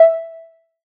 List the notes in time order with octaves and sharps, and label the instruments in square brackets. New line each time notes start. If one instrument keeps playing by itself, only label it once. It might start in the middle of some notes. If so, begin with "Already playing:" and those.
Already playing: [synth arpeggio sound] E5